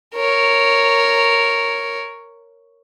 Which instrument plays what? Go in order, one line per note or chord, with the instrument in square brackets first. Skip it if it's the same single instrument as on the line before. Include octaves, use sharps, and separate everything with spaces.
[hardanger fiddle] A#4 C#5